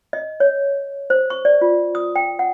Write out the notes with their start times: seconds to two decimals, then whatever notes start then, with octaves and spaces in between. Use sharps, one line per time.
0.13 D#5
0.40 C#5
1.10 C5
1.30 C#6
1.45 D5
1.61 F4
1.95 D#6
2.16 G5
2.39 F#5